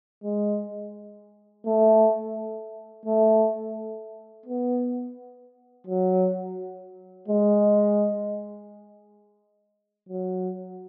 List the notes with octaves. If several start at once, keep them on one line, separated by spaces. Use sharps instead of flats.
G#3
A3
A3
B3
F#3
G#3
F#3